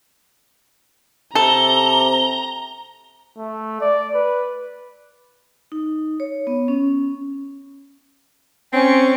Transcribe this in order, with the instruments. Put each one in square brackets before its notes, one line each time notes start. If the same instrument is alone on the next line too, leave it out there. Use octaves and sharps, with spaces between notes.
[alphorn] C3 [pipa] A4 [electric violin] A#5 [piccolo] G7
[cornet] A3
D5
B4
[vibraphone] D#4
C#5
B3
C#4
[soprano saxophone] C4 [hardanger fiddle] C#4 C#6